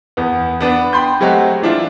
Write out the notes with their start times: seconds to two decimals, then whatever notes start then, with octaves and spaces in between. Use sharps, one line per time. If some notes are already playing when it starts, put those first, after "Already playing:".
0.17 E2 B3
0.61 B3 D4 B4
0.93 G5 B5 C6 G6
1.21 F#3 G#3 A3 C4 F#4 G4
1.62 E3 D4 E4 F4